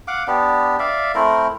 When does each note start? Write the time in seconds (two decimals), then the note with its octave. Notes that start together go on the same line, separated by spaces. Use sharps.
0.08 F5 F#5 D6
0.28 B3 D4 G4
0.79 D5 E5 F5
1.15 A3 C4 E4 A#4